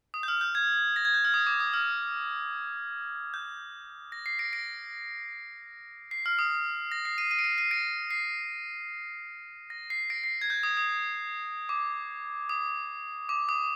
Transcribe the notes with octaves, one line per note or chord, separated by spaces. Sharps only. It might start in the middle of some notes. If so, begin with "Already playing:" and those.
D#6
G6
F6
G6
G#6
A#6
G#6
G6
F6
D#6
D6
D#6
F6
G6
A#6
C7
A#6 D7
A#6 D7
C7
F6
D#6
A#6
C7
C7 D#7
C7 D#7
D7
C7
C7 D#7
A#6 D7
C7
A#6
C7
A#6 D7
C7
G#6
G6
D#6
D#6
D6
D#6
D6
D#6